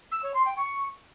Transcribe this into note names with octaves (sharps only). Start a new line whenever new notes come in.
E6
C#5
C6
G5
C#6